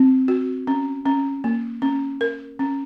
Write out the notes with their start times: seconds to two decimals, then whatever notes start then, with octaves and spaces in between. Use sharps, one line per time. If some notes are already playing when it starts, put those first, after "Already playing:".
Already playing: C4
0.28 F#4
0.67 C#4
1.06 C#4
1.44 A#3
1.82 C#4
2.21 A#4
2.59 C#4